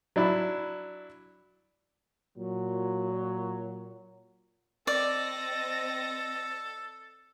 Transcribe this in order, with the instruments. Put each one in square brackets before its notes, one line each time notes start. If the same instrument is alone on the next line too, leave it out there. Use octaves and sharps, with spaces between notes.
[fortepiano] F#3 D4 E4
[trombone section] A#2 F#3
[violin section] C4 D#5 A#6 [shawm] A4 [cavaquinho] D5